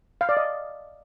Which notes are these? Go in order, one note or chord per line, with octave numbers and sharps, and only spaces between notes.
F5
D5
D#5